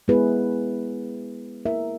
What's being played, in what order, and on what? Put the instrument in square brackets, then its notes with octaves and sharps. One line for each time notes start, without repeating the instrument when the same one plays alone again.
[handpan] G#3 B3 E4 G#4 B4
A#3 E4 A#4 E5